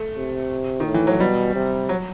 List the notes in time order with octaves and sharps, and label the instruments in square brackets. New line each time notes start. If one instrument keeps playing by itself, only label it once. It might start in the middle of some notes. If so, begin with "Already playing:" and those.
Already playing: [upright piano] A3
[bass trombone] C3
[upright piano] D#3
[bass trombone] A2
[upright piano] E3
F#3
[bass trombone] B2 [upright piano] G3
[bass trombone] C3
[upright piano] F#3